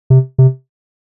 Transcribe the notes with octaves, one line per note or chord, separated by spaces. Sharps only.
C3
C3